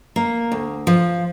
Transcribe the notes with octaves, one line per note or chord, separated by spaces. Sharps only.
A#3
D2
F3